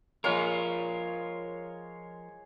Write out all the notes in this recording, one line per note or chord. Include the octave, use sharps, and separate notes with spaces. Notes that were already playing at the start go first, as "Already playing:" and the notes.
F3 G#3 F4 A#4 C#5 F5